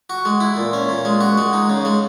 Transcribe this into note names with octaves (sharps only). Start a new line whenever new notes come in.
F#4
G#3
E4
A#2
C#4
A#2
G#3
F#4
G#3
D#4
C#3
G#3